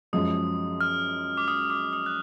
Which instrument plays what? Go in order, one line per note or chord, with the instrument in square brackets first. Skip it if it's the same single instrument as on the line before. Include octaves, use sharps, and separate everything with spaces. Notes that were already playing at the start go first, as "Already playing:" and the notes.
[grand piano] F#2 F3 G#3 [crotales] D#6
[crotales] F6
D6
D#6
D6
D#6
F#6